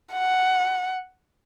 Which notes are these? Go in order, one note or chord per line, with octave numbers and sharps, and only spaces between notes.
F#5